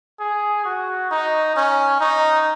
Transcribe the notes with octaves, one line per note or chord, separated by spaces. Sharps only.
G#4
F#4
D#4
C#4
D#4